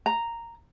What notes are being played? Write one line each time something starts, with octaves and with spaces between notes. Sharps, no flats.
A#5